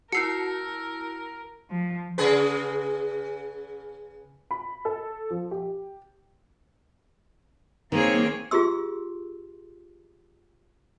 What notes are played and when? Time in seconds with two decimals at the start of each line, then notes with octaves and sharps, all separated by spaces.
0.12 E4 F#4 A#4 A5 E6 C7 C#7
1.71 F3
2.18 C#3 G#4 B4
4.51 B5
4.85 A4
5.30 F3
5.51 G4
7.92 D#3 A#3 C4 G#4 C#5
8.51 F4 G4 G#4 C6 E6